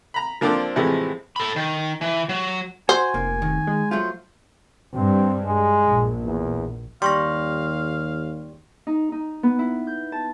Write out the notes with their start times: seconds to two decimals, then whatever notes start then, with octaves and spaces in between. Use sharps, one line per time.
0.14 A#5 B5
0.41 F3 A#3 C4 D4 A4 D6
0.76 A2 C3 E3 F3 G#3 A3
1.36 A4 B5
1.56 D#3
2.01 E3
2.29 F#3
2.89 F#4 C5 G#5
3.14 F1 A#3
3.42 D#3
3.67 G#3
3.91 F#3 A3 F4 C5
4.94 G2 C4
5.44 G#3
5.87 A#1
6.24 E2
7.02 D#2 G3 F5 C6 C#6 A#6
8.87 D#4
9.12 D#4
9.43 B3
9.59 E4
9.87 G6
10.12 A5